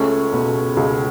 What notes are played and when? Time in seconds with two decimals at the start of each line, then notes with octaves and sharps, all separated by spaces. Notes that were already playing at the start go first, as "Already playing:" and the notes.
Already playing: C#2 A3 C#4
0.33 B2
0.77 C#2